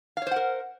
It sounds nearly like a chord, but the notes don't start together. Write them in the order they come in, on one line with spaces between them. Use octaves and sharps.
F5 C#5 C5 F#5 A#4